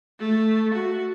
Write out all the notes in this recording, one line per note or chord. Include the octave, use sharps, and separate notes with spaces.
A3
F#4